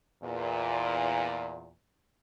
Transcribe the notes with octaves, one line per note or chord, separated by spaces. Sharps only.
E2 A#2